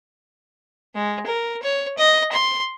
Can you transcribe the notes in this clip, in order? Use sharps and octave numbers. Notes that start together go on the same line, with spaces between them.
G#3
A#4
C#5
D#5
C6